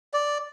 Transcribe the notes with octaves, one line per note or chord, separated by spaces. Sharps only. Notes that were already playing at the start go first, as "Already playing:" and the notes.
D5